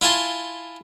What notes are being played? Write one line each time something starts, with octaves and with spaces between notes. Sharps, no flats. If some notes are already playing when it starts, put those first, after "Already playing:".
E4 F4 G#5 A5 C6